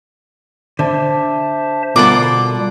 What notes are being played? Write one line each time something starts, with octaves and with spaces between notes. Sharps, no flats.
D3 C5 E5 A5
B2 G3 F4 A4 A#4 F#5 D6